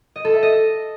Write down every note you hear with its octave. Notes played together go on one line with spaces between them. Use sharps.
D#5
A4
E5
D#5